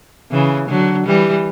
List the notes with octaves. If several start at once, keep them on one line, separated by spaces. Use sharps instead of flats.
C#3 E3
D3 F#3
E3 G3